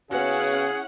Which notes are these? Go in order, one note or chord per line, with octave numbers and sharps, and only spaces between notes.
C#3 B3 C#4 E4 F#4 G#4 F#5